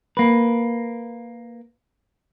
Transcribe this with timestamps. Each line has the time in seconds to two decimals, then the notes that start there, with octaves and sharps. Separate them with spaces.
0.17 A#3 B4